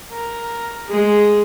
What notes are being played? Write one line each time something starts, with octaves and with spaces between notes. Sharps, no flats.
A#4
G#3 G#4